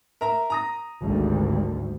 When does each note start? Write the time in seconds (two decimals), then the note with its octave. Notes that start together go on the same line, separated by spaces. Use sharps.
0.21 A#4 E5 A#5
0.50 A#5 D#6 A#6
1.02 G#1 D2 G3